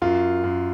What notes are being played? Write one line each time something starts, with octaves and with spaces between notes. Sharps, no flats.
F#2 F4
F#2